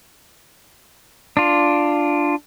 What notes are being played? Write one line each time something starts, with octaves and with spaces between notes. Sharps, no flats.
D4 F4